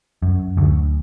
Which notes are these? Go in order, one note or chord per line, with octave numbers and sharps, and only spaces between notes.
F#2
D2